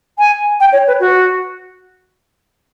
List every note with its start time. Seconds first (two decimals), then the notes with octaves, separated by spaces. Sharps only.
0.18 G#5
0.60 G5
0.72 C#5
0.87 B4
1.00 F#4